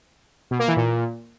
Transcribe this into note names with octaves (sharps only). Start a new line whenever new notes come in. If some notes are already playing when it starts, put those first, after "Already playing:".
B2
A#3
E3
A#2